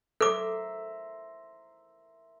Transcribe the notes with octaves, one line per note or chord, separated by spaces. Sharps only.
A4 A#4 C5 E5 D6